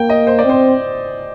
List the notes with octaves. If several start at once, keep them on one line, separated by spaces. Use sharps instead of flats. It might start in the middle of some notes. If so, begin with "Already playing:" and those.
Already playing: A#3 G5
D#5
C5
D5
C4 C5